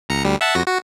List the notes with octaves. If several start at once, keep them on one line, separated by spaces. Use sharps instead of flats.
C#2 A#5 C#7
D2 G3
E5 F#5 A5
F2 F#4 A#6
F#4